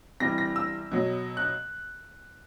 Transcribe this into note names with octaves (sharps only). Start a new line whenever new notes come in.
C3 E3 G3 A#6
A#6
E6
B2 F#3
F#6